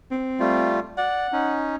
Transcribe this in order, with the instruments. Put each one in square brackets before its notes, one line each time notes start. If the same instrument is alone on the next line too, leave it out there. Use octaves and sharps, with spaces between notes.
[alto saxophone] C4
[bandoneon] G3 A3 F4
[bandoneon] D5 [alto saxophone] F#5
[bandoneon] C#4 D#4